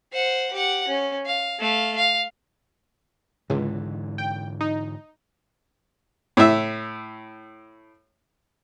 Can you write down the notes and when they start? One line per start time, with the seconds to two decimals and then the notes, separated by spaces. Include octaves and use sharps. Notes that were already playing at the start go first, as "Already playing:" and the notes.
0.13 C5 F#5
0.53 G4 F#5
0.87 C#4
1.26 F5
1.59 A3 F5
1.96 F5
3.50 C#2 G#2 D3 E3
4.18 G5
4.61 D#4
6.37 A2 E5